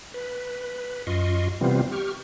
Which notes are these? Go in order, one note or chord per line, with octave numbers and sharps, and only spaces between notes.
B4
F#2 F4 D#5 C6 C#6
C3 E3 G3 B3 C4 F4
G4 C#6 F6